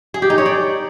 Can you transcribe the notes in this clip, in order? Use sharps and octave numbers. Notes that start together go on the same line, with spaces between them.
G#4
G4
D#4
C#5
D5